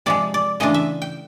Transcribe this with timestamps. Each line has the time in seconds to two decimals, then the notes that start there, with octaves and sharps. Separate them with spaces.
0.06 C3 F3 G#3 D5
0.34 D5
0.60 C#3 E3 A3 D4 F4 D#5
0.74 E5
1.02 G5